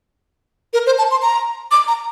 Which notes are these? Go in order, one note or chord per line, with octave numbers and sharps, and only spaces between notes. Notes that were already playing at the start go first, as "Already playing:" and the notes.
A#4
C5
A5
C6
A#5
D6
A#5